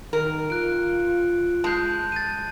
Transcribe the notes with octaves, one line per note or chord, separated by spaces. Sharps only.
D#3 A#4
F4 F#6 D7
G#3 A5 G6
A6 D#7